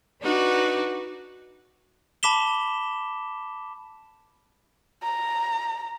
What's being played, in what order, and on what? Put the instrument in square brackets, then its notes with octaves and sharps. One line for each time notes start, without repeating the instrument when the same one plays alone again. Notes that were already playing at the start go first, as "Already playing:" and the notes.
[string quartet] D4 D#4 F#4 B4 D5
[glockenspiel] A5 B5 D6 B6 E7 G7
[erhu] A#5